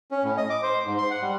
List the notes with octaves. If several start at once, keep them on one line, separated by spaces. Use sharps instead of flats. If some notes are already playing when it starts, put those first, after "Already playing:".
C#4
A2
D#5
D6
C5
G#2
C6
F#5
G3